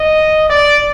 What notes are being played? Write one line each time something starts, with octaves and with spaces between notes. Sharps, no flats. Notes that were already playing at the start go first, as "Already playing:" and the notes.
Already playing: D#5
D5